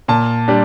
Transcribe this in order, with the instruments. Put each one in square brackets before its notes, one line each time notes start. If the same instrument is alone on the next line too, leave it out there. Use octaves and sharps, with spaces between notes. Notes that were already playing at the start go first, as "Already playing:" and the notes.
[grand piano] A#2 A5
G3 D4